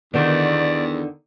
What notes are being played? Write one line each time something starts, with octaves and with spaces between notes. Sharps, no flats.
E2 D3 D#3 B3 D5